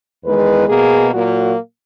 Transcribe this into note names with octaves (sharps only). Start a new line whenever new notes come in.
E2 D#3 G#3 B4
B2 A#3 G#4
A#2 F#3 A#3 F#4